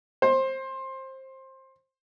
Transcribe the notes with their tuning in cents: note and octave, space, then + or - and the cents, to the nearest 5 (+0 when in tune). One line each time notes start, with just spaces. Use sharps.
C5 +20